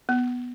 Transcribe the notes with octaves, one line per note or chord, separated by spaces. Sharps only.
B3